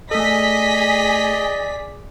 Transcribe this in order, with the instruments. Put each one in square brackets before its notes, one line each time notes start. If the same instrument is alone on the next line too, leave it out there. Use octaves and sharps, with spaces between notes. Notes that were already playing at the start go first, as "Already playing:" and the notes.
[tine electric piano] A3 A4 [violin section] G#4 B6 [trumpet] D5 [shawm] D#5